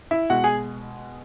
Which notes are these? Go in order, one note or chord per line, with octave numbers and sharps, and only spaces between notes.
E4 E5
B2 G#3 F#4 F#5
G#4 G#5